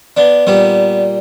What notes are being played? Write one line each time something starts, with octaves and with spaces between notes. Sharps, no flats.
B3 D4
A#2 G3 B3